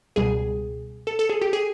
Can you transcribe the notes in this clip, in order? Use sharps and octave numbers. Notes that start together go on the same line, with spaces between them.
C#2 B2 G3 G#4
A4
A4
G#4
G4
G#4